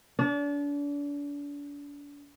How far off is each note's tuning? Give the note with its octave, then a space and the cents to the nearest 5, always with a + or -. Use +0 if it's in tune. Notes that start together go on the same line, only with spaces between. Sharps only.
D4 -35